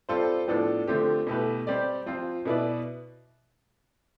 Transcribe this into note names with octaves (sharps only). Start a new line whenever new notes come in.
G3 C4 F4 A4 C5
A2 F3 B3 D4 A4
D3 F3 A3 C4 G4
B2 A3 E4 G4 B4
G3 C4 G4 D5
F3 C4 F4
B2 B3 E4 B4 D5